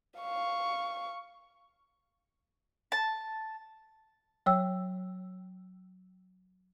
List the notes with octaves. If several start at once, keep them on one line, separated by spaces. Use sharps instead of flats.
F5 C#6
A5
F#3 C#5 G5 E6